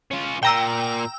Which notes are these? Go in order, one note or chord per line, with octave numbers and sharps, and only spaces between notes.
C#4 F4
A#2 G5 A#5 E6